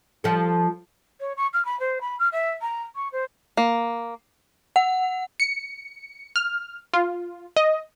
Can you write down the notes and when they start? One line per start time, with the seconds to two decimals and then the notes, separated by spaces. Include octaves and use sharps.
0.24 F3 A4
1.20 C#5
1.37 C#6
1.53 F6
1.65 B5
1.80 C5
2.01 B5
2.19 F6
2.32 E5
2.62 A#5
2.96 C#6
3.12 C5
3.57 A#3
4.76 F#5
5.40 C#7
6.36 F6
6.94 F4
7.57 D#5